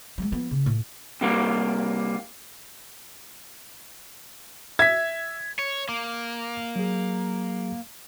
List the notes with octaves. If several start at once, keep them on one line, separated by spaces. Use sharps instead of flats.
F#3 G#3
F3 B3
C#3
A2
C3 G3 A#3
E5 G#6 B6
C#5
A#3 D6
F#3 G#4